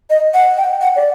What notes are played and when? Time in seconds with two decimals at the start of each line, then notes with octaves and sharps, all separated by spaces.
0.10 D#5
0.34 F#5
0.57 G5
0.81 F#5
0.96 D5